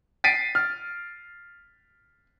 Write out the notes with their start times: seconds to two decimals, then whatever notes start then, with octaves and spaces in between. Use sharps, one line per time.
0.24 A6 B6 C7 D7 D#7
0.55 F6